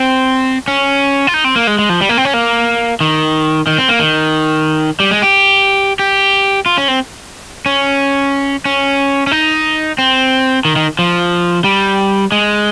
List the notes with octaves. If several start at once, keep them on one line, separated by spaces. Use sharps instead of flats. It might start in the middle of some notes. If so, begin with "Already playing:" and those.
Already playing: C4
C#4
F4
D#4
C4
A#3
G#3
G#3
F3
G3
A#3
C4
C#4
A#3
D#3
D#3
C4
A#3
D#3
G3
G#3
G4
G4
F4
C#4
C4
C#4
C#4
C#4
D#4
C4
D#3
D#3
F3
G3
G#3